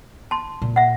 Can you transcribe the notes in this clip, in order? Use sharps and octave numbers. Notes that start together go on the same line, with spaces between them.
A5 C6
A#2
E5 F#5